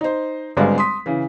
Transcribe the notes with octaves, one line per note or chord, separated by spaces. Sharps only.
D#4 C5
G#1 D3 G3 G#3 B3 F5
C6 D#6 B6
C#3 E3